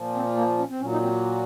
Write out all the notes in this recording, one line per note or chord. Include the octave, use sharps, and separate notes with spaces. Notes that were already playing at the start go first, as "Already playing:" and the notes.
Already playing: A#2 F3
C4
A#3
C#4
C4
A#2 F#3 C#4
D#4
C4